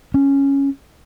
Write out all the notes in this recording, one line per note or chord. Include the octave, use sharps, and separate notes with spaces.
C#4